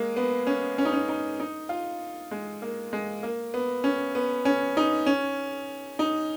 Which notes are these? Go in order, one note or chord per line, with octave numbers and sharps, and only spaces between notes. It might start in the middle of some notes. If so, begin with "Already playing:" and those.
Already playing: G#3 A#3
B3
C#4
C#4
D#4
C#4
D#4
D#4
F4
G#3
A#3
G#3
A#3
B3
C#4
B3
C#4
D#4
C#4
D#4